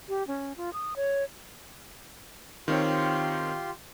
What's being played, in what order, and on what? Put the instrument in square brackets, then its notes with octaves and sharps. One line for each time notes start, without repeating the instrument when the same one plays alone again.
[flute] G4
C#4
F4
D#6
C#5
[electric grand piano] D#3 C4 C#5 [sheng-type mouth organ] F4 G4 C6